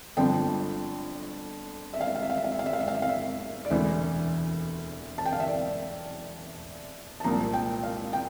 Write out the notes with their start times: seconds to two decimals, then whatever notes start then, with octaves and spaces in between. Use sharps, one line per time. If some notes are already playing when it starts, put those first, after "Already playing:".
0.17 G1 F2 D3 F3 G5
1.94 E5
2.01 F5
2.08 E5
2.16 F5
2.23 E5
2.30 F5
2.37 E5
2.44 F5
2.52 E5
2.59 F5
2.66 E5
2.73 F5
2.80 E5
2.88 F5
2.95 E5
3.02 F5
3.09 E5
3.65 D5
3.70 E1 D2 C3 E3 E5
5.18 A5
5.26 G5
5.33 F5
5.40 E5
5.48 D5
7.20 A5
7.24 C2 A#2 F3 A#5
7.53 G5
7.83 F5
8.13 G5